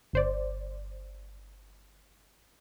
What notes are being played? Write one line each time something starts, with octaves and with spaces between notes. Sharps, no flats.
G1 C5 D5